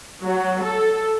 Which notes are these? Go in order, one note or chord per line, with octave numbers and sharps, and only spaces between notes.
F#3
A4